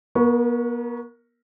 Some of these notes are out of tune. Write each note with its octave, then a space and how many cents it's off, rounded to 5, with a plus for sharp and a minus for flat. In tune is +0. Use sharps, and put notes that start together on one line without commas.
B3 -40 A#4 +0 C#6 +0